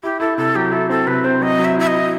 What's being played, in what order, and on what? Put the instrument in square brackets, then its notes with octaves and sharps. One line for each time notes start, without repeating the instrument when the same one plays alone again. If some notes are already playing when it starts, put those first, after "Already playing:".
[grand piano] E4 [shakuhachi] G4
[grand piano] E4 [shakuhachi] A4
[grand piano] C3 [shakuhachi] A4
[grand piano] F#3 [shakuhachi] G4
[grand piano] E4 [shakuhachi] A4
[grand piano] C4 [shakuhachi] A4
[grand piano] C3 [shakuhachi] B4
[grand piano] C4 [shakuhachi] C5
[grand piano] F#3 [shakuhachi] D#5
[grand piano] F#3
[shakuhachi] E5
[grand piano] E4 [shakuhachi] E5
[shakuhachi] D#5
[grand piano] E4